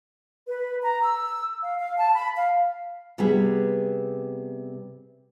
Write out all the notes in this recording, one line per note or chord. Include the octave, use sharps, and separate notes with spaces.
B4
A#5
E6
F5
F5
A5
B5
F5
C3 G3 B3 G#4